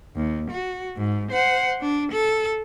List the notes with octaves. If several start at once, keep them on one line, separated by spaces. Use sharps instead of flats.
D#2
F#4
G#2
C5 F#5
D4
A4